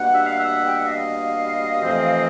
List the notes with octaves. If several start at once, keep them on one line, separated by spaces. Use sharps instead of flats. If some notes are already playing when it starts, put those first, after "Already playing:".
Already playing: B2 G3 A#3 D4 F#5
E5
F5
E5 F#5
G5
F#5
D#5 F5
F2 C3 E3 A3 C4